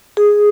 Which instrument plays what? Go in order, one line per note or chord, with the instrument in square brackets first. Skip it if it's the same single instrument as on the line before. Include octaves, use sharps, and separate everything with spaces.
[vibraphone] G#4